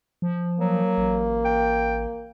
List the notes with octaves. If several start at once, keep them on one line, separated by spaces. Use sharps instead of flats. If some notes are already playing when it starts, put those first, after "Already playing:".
F3
F#3 A#3
A1
G5